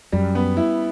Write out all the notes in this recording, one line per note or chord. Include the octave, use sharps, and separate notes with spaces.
F#2 G3
B3
E4